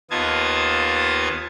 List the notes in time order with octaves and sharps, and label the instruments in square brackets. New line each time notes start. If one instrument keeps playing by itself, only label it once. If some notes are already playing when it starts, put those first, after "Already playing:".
[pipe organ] D#2 B3 F4 D#5 A5 G#6